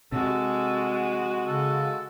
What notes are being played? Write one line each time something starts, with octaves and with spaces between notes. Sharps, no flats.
C3 G#3 F#4 A4
C#3 A4